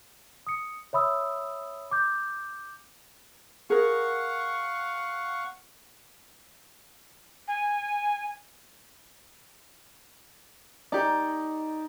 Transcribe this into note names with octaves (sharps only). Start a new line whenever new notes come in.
D#6 C#7
C#5 E5 B5 D#6 E6
D6 G6
G#4 A#4 F5 F#5 C#6
G#5
D#4 G4 D5